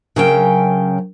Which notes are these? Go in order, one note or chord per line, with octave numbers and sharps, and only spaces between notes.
C#3 F#3 C#4 A#4 G5